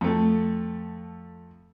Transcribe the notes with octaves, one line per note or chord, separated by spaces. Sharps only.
F2 A3